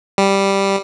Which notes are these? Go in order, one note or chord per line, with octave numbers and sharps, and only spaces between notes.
G3